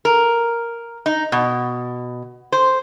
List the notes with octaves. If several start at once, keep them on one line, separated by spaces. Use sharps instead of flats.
A#4
D#4
B2
C5